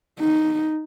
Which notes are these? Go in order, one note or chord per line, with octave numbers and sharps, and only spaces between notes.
D#4